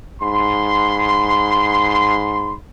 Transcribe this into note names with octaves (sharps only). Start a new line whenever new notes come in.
G#2 B5 C6